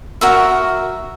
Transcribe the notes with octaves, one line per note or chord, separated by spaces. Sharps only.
F#4 A#4 E5